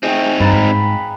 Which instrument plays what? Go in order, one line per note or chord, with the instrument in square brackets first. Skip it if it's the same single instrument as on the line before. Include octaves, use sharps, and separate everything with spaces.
[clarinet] A3 [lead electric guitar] C4 D#4 [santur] G#4 G5
[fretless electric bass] G2 [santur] B4 F5 A#5 [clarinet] A5
[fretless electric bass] G#2 [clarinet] B5